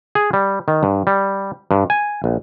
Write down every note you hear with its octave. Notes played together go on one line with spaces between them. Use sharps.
G#4
G3
D#3
G2
G3
G2
G#5
A#1